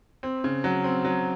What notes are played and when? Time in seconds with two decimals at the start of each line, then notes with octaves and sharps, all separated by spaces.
0.23 C4
0.44 C#3
0.64 F#3
0.84 C4
1.05 F#3